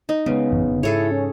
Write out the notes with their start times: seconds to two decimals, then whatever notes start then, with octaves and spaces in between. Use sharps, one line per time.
0.09 D#4
0.26 C#3 G#3 A3 B3
0.51 A1 F#2 E3
0.67 F#1 A2 D3
0.83 G#2 E4 G#4 A4 C#5
1.11 C#4